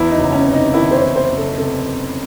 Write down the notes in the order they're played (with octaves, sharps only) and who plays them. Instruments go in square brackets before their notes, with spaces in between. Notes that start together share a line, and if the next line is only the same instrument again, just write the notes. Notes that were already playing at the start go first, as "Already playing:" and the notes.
Already playing: [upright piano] E2 E4
D#4
F#1
C#4
C3
D#4
D#3 E4
C5
C#5
E2
C5
F#1
A4
C3 A4